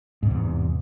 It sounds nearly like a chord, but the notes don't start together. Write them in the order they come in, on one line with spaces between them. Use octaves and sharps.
G#2 C3 E2